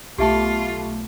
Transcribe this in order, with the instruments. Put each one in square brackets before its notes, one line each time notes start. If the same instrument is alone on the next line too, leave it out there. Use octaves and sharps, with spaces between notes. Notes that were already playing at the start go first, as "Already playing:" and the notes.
[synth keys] B1 A3 [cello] F4 [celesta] G4 E5 A5